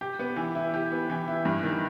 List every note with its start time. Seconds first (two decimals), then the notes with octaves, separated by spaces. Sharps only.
0.01 G4
0.19 B3
0.36 E3
0.55 E4
0.74 G4
0.92 B3
1.10 E3
1.28 E4
1.45 G2
1.63 D#3